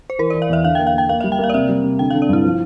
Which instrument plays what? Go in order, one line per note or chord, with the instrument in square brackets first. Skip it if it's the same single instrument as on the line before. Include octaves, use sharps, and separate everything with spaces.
[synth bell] C5
[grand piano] E3 [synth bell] A#4
[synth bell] D5
[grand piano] E3
[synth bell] F5
[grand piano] E2 [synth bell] E5
[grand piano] D3 [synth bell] F5
[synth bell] G5
[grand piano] A#3
[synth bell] F5
[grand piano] A#3 [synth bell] G5
[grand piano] A#3 [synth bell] F5
[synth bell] E5
[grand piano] G3
[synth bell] G5
[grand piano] A#3 [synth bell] F5
[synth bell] D5
[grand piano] C3 [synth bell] E5
[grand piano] G3
C3
[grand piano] D3 [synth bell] G5
[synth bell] F5
[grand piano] D3
[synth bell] D5
[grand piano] G2 [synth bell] E4
[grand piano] F3